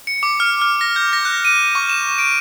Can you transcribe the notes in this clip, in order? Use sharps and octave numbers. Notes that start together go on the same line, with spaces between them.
C#7
D6
F6
F6
A#6
G6
A#6
F#6
D#7
C#6
E7
D7